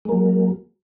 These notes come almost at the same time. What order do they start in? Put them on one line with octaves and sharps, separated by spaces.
G#3 A#3 F#3